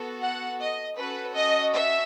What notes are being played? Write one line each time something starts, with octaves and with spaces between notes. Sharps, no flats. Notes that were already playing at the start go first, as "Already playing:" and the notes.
Already playing: B3 F#4 A4
F#5
D#5
C#4 F#4 A4 B4
D#5
E5